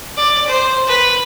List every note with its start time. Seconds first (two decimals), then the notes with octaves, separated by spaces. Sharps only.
0.17 D5
0.46 C5
0.87 B4